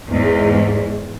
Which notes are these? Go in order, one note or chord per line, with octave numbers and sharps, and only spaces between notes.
E2 G#2